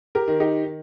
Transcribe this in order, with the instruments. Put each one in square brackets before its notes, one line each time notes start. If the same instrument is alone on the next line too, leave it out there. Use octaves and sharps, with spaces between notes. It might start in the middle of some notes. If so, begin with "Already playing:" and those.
[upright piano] G4 A#4
D#3
D#4 G4
D#3